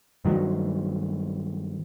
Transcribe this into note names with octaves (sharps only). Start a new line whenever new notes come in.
G2 D#3 F#3